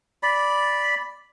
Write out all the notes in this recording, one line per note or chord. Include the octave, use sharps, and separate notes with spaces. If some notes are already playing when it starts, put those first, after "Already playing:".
D5 B5